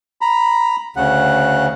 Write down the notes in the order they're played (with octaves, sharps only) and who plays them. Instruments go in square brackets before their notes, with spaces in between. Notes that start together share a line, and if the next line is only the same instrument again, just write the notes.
[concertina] A#5 B5
[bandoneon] D2 C#3 [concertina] F#5